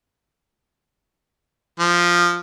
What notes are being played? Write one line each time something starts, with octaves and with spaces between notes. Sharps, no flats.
F3